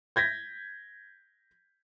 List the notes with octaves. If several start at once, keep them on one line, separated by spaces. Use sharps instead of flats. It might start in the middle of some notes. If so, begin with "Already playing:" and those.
G6 G#6 A#6 B6